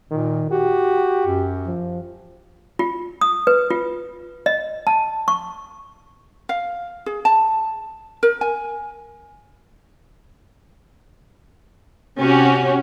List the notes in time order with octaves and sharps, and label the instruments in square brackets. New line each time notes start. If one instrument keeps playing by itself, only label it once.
[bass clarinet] A#2 [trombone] D#3
[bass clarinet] F#4 [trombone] G4
[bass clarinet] F#2
[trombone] F3
[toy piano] F4
D#6
B4
F4
D#5
A5
C#6
[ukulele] F5
G#4
A5
A#4
G#5
[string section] C3 C#4 F#4 G4